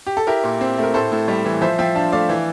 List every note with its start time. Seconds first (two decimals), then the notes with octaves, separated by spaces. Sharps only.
0.06 G4
0.17 A4
0.27 E4 G4 A#4
0.44 A#2
0.61 C4
0.78 A3
0.83 A#4
0.94 A2 A4 C5
1.12 A2
1.28 G3
1.45 E3
1.62 F3 C5 E5
1.79 F3 E5 G5
1.95 D4 F5 A5
2.12 A3 D5 F5
2.29 E3